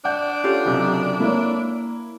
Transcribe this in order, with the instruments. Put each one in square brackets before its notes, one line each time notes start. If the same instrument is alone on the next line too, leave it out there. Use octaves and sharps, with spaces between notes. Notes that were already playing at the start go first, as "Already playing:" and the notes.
[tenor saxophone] D4 [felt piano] D5 F#5 G6
[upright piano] C#4 [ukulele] F4 G4 A4
[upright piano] F#1 F#2 C3
[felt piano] A#3 C#5 [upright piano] E4